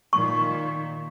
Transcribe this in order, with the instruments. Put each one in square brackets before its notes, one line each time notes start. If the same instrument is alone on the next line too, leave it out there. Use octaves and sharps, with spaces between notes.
[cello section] A#2 D#3 [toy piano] C#6